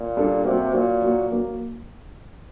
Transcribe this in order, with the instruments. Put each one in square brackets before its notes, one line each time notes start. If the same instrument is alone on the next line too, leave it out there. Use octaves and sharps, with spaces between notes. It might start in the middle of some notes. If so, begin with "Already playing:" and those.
Already playing: [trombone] A#2
[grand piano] G3 D4 A4
[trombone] C3 [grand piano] F#3 A#3 F#4
[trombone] A#2 [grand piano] F#3 A#3 F#4
[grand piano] F#3 A#3 F#4
F#3 A#3 F#4